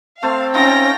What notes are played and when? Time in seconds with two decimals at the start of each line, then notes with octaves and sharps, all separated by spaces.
0.23 A3 C4 C5 F5 A5
0.54 C#4 D#4 F4 G5 A#5 A#6